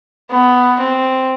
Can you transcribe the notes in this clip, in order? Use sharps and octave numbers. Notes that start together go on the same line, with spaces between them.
B3
C4